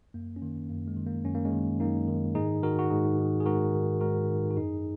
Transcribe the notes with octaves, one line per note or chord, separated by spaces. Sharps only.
F#2 A#3
C#4
D#3 A#3
F#2 A#3
G#3
D#3
A#3
F#2 C#4
A#3
G#3 C#4
D#3
F#2 A#3 D#4
D#3
G#2 D#4 G#4
D#3 F#4 A#4
F#4
G#2 D#4 G#4
D#3
G#4
G#2 F#4 A#4
D#3
G#2 F#4 A#4
D#3
F#4
F#2 D#4 G#4